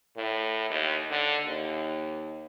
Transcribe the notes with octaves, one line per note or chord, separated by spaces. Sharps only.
A2
D#2
D3
D#2